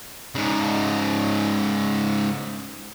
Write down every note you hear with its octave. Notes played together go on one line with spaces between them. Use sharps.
G#2 C#3